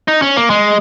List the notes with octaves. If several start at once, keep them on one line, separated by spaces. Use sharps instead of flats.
D#4
C#4
A#3
G#3